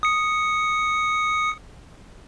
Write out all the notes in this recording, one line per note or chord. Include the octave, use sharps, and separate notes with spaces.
D#6 C#7